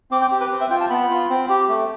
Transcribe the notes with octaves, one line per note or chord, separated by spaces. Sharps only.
C4 D6
G5
G4
B4
C4
E5
F4 G5
A5
B3 B5
F4
C4
G4
A3